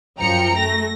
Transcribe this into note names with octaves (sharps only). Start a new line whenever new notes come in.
F#2 F3 G5 A#5 C#7
A3 A#6